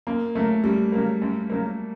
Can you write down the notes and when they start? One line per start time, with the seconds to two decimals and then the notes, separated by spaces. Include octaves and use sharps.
0.07 F#2 A#3
0.35 C#3 F#3 A3 A#3
0.64 F#2 G3
0.92 C#3 F#3 A#3
1.22 F#2
1.50 C#3 F#3 A#3